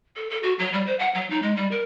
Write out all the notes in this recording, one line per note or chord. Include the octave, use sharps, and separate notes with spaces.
A4
A4
F#4
F#3
G3
C5
F#5
F#3
D#4
G#3
G3
A#4